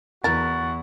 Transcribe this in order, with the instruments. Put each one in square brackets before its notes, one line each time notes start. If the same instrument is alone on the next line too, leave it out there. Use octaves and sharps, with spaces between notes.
[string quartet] E2 [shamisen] E4 A#4 [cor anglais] F#4 [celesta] A6